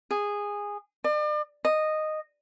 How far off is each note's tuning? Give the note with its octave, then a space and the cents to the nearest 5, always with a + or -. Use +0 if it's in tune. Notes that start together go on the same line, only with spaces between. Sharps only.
G#4 -15
D5 +40
D#5 -10